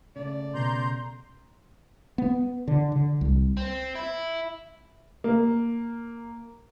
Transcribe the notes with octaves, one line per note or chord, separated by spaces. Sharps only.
C#3 A3 D5
B2 A#5 C6 G6
B3
D3
D3
C2
C4
E4
A#3